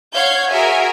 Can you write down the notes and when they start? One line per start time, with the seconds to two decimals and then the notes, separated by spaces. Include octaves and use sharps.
0.13 C#5 F5 F#5 G6 G#6
0.51 F#4 G#4 A#4 E5 G#5